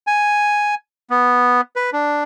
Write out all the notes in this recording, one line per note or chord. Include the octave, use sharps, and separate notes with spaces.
G#5
B3
B4
D4